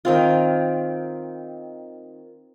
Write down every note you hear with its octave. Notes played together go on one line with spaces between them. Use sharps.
D#3 C4 F4